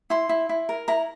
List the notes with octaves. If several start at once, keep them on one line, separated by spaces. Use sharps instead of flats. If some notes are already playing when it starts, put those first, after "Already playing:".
E4 C6
E4
E4
A#4
E4 A#5